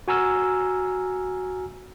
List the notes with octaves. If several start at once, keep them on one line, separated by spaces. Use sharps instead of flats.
F#4 G#5 A#5 E6 F6